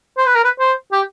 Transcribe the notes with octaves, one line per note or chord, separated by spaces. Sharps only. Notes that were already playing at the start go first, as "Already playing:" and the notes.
C5
B4
A#4
B4
C5
G4